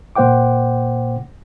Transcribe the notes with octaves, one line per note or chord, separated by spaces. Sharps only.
A#2 A#3 C5 F#5 G5 D6